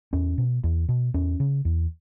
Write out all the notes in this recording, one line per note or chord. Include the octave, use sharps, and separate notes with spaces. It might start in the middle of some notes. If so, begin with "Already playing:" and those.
E2 C#4
B2
E2
B2
E2 C#4
C#3
E2